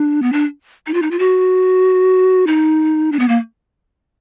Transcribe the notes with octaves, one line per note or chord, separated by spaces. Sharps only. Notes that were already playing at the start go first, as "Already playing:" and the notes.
Already playing: D4
B3
D4
D#4
F4
D#4
F4
F#4
D#4
D4
B3
A#3